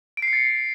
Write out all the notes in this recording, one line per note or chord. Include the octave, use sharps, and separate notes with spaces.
D7
C7
C#7
A6